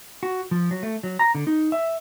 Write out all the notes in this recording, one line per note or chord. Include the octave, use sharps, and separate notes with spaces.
F#4
F3
F#3
A3
F#3
A#5
D3
D#4
E5